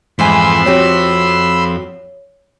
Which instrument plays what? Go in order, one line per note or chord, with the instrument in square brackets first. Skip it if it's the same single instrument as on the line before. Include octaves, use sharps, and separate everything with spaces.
[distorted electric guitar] F2 [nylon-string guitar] G#2 E3 G#5 [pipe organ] B5 C6 E6
[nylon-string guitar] C4 F#4 G4 [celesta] C#5